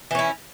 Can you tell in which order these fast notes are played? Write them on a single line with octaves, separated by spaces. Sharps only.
E3 C#4 E4